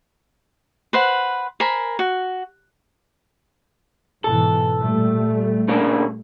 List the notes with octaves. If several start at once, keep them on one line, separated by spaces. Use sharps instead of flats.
B4 C5 F#5
A#4 C5 G#5 B5
F#4
G#2 B2 E3 A4
A#2 G3 A3
C#3 A#3 D4